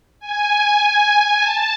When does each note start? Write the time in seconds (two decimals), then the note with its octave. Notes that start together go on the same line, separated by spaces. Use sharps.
0.20 G#5
1.36 A5